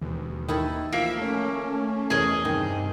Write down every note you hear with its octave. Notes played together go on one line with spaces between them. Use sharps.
E1 D#2
D#3 E4 A4
E3 F3 A#3 E6 B6 D7
A3 C#4 A#4
E2 G#4 A#4 D#5
G2 C3 D#3